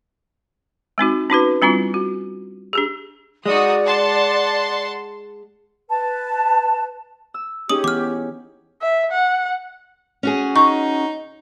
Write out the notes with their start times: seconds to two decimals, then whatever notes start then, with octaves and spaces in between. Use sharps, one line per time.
0.98 G#3 C4 D#4 F#4
1.30 C#4 D#4 F#4 B4
1.62 G3 C4 D4 E4 F4
1.94 F#4
2.73 D4 G4 G#4
3.46 G#3 D#4 F#4 D5 D#6
3.84 F#5 A5 C6
5.89 B4 A5
7.34 E6
7.69 C#4 D#4 G4 G#4 D#6 F#7
7.84 E3 B3 D6 F6
8.81 E5
9.12 F#5
10.23 C#4 F#4 G#4
10.56 D#4 C#6